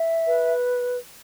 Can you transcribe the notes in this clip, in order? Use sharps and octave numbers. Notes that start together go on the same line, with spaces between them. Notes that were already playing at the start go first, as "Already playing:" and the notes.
Already playing: E5
B4